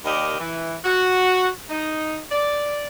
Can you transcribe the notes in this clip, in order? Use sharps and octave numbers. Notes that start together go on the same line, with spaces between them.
D#2 D#3 G4 A#4 D5 D#5
E3
F#4
D#4
D5